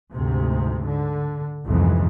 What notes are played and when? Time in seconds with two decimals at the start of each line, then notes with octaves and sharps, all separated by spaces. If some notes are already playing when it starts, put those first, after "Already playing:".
0.13 D2 G#2 C3
0.86 D3
1.65 G1 C2 F2 G#2 E3